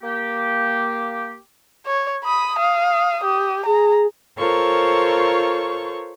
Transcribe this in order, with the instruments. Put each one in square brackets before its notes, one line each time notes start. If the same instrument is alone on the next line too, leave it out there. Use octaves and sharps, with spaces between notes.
[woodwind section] A#3 G4
[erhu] C#5
[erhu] B5 [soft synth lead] D#6
[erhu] F5
G4
[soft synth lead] G#4 [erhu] A#5
[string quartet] F4 A4 A#4 C5 C#5 C#6